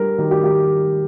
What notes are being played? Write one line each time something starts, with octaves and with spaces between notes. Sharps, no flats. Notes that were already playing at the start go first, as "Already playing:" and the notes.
Already playing: G3 D4 A#4
D#3 G4
G4
D#3 G4